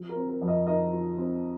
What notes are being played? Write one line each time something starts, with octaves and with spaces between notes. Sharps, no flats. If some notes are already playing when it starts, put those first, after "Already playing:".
Already playing: F3
A#4
C4
A#4
F2
A#4 D#5
D#4 A#4 D#5
F3
C4